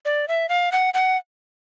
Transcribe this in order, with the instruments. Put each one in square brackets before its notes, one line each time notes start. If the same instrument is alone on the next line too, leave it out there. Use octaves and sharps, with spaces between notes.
[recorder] D5
E5
F5
F#5
F#5